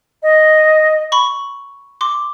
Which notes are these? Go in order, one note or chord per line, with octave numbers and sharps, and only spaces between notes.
D#5
B5 C#6
C6 D6